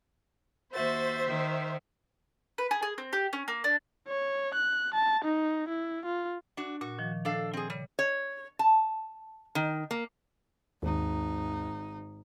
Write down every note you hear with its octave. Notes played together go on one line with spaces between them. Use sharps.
D#2 F#4 C5 E5 A6
D#3
B4
G#4
G#4
C4
G4
C#4
A#3
D4
C#5
F#6
A5
D#4
E4
F4
D4 F#4
A#2 F#4
D#3 F3
D4 A4 F5
C4 G#4
C#3 G3
C#5
A5
D#3
A#3
G#1 D#2 D#4